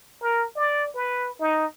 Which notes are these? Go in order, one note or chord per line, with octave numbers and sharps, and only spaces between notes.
A#4
D5
B4
D#4